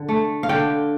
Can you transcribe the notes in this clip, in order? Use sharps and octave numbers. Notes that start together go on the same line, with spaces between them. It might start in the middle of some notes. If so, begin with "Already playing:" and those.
Already playing: D3
A3
F5
D3 G5